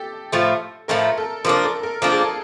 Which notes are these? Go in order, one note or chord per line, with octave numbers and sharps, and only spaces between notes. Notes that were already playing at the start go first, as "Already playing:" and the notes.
Already playing: G4 A4
A2 F3 A3
A2 F3 A3 A#4
A4
F3 A#3 D4 A#4
A4
A#4
F3 A#3 D4 A4
G#4
A4